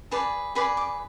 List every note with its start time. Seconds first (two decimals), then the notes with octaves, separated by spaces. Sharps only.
0.11 G#4 B4 D5 A5
0.55 G#4 B4 D5 B5
0.77 D6